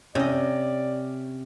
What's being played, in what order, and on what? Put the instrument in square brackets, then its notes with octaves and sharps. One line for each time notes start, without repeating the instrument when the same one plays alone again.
[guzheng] C3 D#5 [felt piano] C#4 [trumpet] D5